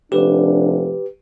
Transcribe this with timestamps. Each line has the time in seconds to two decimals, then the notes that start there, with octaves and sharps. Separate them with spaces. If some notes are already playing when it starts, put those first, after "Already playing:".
0.12 F1 D4 G4 B4